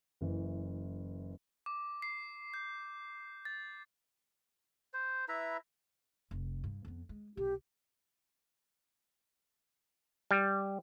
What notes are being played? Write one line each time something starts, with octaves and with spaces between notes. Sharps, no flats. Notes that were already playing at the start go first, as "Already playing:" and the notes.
F#1 E3
D6
C7
G6
A6
C5
E4 B4 E5 A#5
F1
G2
F2 B3
G#3
B1 G4
G3